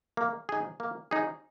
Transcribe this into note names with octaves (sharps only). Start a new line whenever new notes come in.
A#3
D#4 G#4
A#3
D#4 G#4